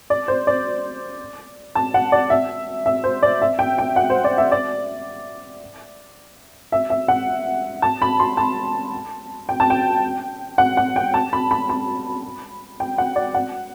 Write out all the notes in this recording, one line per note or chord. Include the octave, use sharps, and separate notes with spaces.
D5
C5
D5
A5
F#5
D5
E5
E5
C5
D5
E5
G5
G5
F#5
C5
D5
E5
D5
E5
E5
F#5
A5
B5
C6
A5
G5
A5
G5
F#5
F#5
G5
A5
B5
B5
B5
G5
F#5
D5
F#5